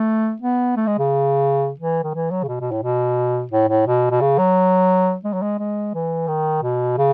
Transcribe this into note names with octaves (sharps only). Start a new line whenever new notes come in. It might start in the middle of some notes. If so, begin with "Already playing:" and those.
Already playing: A3
B3
A3
G#3
C#3
E3
D#3
E3
F#3
C#3
B2
B2
A2
B2
A2
A2
B2
B2
C#3
F#3
G#3
F#3
G#3
G#3
E3
D#3
B2
C#3